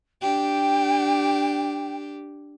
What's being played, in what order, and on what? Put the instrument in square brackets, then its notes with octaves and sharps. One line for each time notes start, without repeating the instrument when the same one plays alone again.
[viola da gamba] D4 G4 [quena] G5